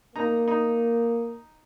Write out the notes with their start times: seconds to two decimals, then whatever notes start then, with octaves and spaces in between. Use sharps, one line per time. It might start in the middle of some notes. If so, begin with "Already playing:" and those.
0.16 A#3 D#4 A#5
0.48 D#4